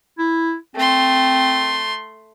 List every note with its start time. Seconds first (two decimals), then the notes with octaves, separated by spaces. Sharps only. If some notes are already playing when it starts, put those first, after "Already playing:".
0.18 E4
0.76 A3 C4 C6